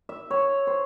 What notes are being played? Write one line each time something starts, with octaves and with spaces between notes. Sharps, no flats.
E5
C#5
C5